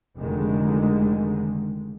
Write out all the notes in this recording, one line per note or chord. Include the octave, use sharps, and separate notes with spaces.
F1 D3 D#3 G#3